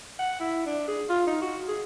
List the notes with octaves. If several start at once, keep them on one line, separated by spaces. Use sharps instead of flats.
F#5
E4
D4
G#4
F4
D#4
F#4
G#4